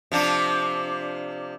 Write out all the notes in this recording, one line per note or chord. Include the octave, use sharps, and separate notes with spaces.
C3 F3 D4